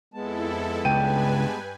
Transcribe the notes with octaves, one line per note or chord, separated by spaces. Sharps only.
F2 G#3 B3 E4 A4 A5
C#2 G2 B4 G5 G#5 D#7